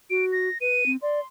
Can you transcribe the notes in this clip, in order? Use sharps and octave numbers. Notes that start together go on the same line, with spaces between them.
F#4 D7
A#6
B4 D#7
C4
D5 C6